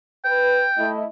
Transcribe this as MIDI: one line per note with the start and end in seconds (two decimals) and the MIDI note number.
0.25 0.64 71
0.25 0.89 79
0.77 1.03 57
0.77 1.03 64
0.77 1.03 75